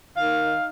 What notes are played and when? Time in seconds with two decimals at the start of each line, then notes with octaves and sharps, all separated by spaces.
0.16 D#3 F5
0.39 D#4